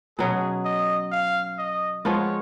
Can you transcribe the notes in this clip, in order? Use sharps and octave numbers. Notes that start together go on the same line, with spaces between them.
B2 F#3 C#4 G#4
D#5
F5
D#5
F3 G#3 B3 F4 C#5